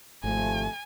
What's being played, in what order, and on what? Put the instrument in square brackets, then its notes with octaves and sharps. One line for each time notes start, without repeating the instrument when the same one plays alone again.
[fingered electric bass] G#1 [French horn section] C3 F3 A3 [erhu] G#5